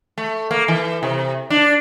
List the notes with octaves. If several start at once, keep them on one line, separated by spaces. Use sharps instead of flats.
A3
A#3
E3
C3
D4